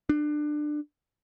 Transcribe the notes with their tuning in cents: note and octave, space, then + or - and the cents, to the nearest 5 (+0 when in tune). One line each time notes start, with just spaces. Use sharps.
D4 +20